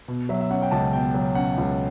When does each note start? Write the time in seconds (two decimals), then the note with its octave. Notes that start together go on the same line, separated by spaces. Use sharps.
0.08 B2
0.29 F#3 E5
0.41 E5
0.50 C#4 F#5
0.62 G5
0.71 C#2 A5
0.93 B2 G5
1.15 F#3
1.35 C#4 F#5
1.58 C#2